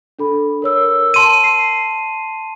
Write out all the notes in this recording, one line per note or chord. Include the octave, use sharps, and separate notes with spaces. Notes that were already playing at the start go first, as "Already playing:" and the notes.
D4 A4 B5
A#4 C#5 E6
A5 C6 D#7
C7